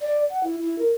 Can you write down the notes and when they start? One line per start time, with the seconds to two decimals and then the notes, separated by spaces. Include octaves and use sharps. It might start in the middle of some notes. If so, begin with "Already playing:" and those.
0.01 D5
0.30 F#5
0.43 E4
0.62 E4
0.78 A#4